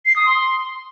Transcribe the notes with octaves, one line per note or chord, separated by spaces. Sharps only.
C7
D#6
C6